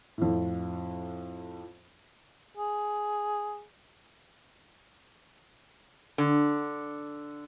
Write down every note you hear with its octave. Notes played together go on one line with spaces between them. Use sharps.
F2 A2
G#4
D3